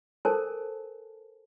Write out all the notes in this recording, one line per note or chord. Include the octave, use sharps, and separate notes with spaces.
A4 A#4 C5 G#5 A5